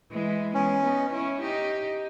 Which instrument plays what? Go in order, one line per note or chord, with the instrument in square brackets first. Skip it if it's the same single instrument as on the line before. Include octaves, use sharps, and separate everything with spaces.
[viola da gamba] E3 G#3
[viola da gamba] G#3 B3 [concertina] C#4
[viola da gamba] B3 D#4
C#4 E4
D#4 G4